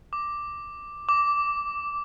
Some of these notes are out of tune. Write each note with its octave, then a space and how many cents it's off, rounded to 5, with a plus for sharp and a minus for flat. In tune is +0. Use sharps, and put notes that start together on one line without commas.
D6 +5
D6 -10